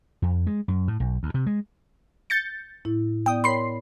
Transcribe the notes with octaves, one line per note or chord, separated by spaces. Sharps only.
F2
G#3
F#2
A2
B1
D2
C3
G#3
G6 A6 C#7
A2 E4
B3 D5 G5 D#6
A#4 C#5 B5 C6 C7